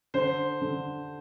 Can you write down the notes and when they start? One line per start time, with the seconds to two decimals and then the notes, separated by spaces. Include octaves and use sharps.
0.14 D3 C5
0.61 D3